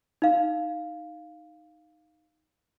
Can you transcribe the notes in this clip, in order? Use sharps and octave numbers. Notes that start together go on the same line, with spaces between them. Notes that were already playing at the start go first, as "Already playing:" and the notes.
D#4 F5